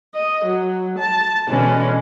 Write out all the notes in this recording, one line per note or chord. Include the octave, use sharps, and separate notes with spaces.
D#5
F#3
A5
B2 D3 E3 G#3 C#4